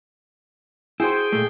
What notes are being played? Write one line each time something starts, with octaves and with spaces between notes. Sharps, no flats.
E4 F#4 G#4 C5 G5
A#2 A3